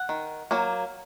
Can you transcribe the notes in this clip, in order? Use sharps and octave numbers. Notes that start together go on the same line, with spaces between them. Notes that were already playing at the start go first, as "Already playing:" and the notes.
Already playing: F#5
D#3
F#3 A#3